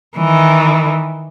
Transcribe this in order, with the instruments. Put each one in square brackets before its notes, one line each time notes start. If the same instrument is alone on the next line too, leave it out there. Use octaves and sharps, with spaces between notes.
[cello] D#3 E3